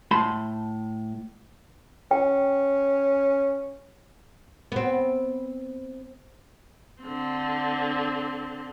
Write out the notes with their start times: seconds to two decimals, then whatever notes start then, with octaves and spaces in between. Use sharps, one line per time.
0.11 A2 A5 B5 C6
2.11 C#4 G5
4.72 B3 C4
7.02 D3 C4